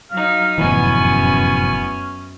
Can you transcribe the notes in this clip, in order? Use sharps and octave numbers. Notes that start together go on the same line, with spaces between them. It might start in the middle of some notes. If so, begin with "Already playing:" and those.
F#3 D#4 F5
F1 F#2 A2 E3 B3 C#4 G#5